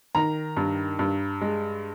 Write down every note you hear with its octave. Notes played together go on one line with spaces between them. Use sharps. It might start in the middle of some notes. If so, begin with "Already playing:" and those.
D#3 A#5
G2
G2
G#3